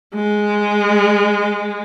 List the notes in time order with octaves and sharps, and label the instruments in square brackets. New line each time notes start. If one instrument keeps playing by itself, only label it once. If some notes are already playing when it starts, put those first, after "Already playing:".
[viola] G#3